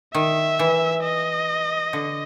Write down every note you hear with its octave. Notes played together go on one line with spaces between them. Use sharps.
D#3 E5
E3
D#5
D3